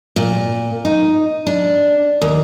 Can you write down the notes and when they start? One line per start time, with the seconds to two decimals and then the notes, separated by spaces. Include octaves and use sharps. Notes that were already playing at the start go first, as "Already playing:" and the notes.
0.16 A#2
0.85 D#4
1.47 D4
2.22 D#2